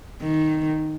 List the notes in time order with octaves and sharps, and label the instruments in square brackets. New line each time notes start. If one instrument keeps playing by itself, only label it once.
[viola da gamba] D#3